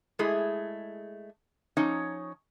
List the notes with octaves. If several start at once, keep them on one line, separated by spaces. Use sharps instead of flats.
G#3 A3 E4 G#4
F3 C#4 D#4 C#5